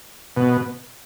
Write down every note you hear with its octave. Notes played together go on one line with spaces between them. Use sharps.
B2